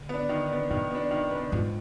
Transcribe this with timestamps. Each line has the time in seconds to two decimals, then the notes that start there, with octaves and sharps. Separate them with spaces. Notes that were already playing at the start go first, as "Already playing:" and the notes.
Already playing: D3
0.09 B3 D4
0.29 D#3
0.50 B3 D4
0.70 C3 D#3
0.91 B3 D4
1.11 D#3
1.31 B3 D4
1.52 G#2 F3